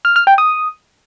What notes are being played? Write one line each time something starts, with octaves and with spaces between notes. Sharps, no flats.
F6
F6
G5
D#6